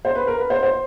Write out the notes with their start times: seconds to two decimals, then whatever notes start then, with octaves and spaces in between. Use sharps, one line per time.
0.05 C5
0.15 B4
0.27 A#4
0.39 B4
0.50 C5
0.63 C5